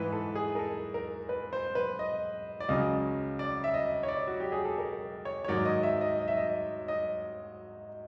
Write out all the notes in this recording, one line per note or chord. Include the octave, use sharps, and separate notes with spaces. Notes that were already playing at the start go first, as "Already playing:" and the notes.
Already playing: G#2 E3 B4
A4
G#4
A#4
A4
A#4
B4
C5
B4
D#5
D5
C#2 C#3 F#3 D#5
D5
E5
D#5
C#5
D5
F#4
G4
G#4
A4
A#4
C#5
C#5
G#2 D#3 F#3 D5
D#5
E5
D#5
D#5
E5
D#5
D#5